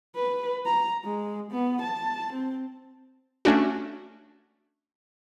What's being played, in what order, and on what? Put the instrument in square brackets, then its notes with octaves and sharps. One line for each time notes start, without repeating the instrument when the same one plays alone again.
[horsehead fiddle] B4
A#5
G#3
B3
A5
C4
[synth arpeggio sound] A3 C#4 D4 F#4